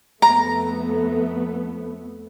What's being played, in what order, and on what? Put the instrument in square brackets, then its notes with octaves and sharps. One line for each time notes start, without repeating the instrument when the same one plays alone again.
[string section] F2 A3 B3 [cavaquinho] A#5